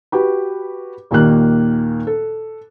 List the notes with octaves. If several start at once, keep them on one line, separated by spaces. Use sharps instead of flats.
F#4 G4 B4
D#2 A#2 D#3 A#3 F#6
A4